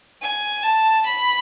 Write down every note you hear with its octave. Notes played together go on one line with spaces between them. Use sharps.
G#5
A5
B5